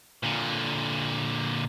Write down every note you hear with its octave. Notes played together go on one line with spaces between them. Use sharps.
A#2 D3